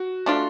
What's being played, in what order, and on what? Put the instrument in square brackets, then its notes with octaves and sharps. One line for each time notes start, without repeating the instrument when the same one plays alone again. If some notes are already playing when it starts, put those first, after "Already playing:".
Already playing: [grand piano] F#4
[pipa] A3 D4 F4